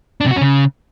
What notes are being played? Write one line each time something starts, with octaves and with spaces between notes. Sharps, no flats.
D4
C3
F#4
C#4
C#3